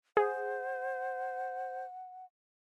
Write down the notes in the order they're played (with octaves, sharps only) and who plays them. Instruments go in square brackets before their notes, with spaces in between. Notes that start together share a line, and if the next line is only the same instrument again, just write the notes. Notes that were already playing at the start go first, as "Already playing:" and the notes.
[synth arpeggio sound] G#4 [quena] C5 [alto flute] F#5